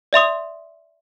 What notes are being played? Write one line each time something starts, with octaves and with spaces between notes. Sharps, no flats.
D5 E5 C6 D#6